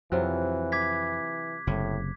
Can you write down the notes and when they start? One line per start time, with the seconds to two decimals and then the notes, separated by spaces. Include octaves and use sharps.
0.12 F2 C3 E3 F#3 F4 F#6
0.72 D6 G#6 B6
1.67 F#1 A2 C3